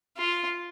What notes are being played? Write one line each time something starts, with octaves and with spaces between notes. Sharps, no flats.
F4